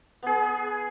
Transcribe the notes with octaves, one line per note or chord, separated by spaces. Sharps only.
B3 G#4